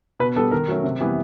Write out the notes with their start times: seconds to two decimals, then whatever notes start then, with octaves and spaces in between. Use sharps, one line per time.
0.19 B2 B4
0.36 G3 B3 A4
0.52 D#3 A#4
0.68 F#3 A3 C#4
0.84 C3
1.00 E3 G3 B3